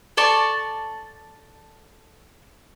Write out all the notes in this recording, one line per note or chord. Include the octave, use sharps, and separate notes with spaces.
A4 D5 A5 C#6